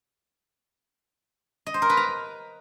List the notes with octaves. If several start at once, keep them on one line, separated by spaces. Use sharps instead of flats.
D#5
C5
A#4
B4
A#5